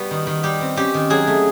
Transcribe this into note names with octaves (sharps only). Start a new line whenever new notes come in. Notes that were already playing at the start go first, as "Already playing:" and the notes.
Already playing: G3 B3 F#4
D#3
D#3
G3 G4
C4
C#4 G4
D#3
F#3 G#4
A3